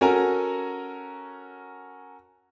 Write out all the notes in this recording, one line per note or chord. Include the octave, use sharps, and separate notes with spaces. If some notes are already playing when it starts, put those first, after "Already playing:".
C#4 F#4 A4 A#4 G#5 A#5